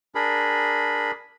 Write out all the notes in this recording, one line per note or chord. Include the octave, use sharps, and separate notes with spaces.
D4 G#4 A#4 B5